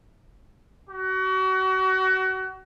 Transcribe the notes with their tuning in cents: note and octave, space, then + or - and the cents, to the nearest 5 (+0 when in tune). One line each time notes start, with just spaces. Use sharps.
F#4 +30